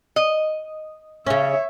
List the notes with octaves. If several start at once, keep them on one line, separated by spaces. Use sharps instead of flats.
D#5
C#3 C#4 C#5 E5